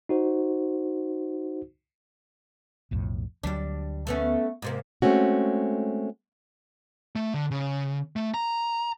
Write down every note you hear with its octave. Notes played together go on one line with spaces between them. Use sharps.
D#4 F#4 C5
B1 F2 A2
D2 F#3 G3 D4
A3 B3 C#4
G#2 C3 A#3
G#3 A3 C4 C#4 F#4
A3
D3
C#3
A3
A#5